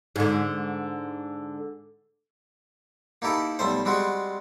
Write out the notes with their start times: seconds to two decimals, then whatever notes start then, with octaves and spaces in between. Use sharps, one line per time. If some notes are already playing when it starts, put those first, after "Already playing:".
0.16 G#2 D3
3.22 A#3 D#4 E4 G4 A4
3.59 B1 G3 A3 C5
3.85 G3 G#3 C4 F#4